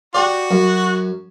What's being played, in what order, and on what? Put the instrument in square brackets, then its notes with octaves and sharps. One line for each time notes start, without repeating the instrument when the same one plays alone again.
[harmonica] F#4 [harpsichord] G4 D5
[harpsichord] F#2